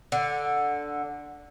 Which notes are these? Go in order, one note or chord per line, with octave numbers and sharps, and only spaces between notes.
D3